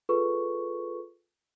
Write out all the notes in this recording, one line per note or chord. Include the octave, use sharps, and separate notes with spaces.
F4 G#4 A4 B4 C#6